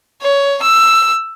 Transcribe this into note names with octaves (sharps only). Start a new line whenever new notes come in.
C#5
E6